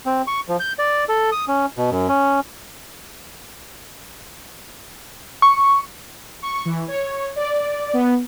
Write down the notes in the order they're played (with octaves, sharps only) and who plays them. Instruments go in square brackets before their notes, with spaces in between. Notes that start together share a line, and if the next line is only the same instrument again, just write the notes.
[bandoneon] C4
C#6
F3
G6
D5
A4
D#6
C#4
B2
F#2
C#4
[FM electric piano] C#6
[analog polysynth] C#6
E3
C#5
D5
B3